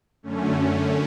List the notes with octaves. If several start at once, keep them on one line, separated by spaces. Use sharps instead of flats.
F#2 D3 A3 C#4